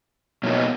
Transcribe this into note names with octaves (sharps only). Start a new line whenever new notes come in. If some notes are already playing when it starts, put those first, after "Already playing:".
B2 F#3 A#3 D#4